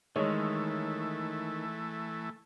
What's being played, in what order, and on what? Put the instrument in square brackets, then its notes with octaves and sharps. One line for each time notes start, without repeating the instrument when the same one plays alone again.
[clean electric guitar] D#3 [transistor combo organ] E3 A3 [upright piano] G#3 C#5